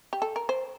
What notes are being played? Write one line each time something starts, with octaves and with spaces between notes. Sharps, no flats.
G4
A4
A#4
C5